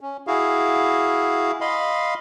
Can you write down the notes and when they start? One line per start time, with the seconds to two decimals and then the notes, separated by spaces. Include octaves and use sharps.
0.01 C#4
0.27 E4 F#4 G#4 F5
1.61 D#5 F5 B5 C6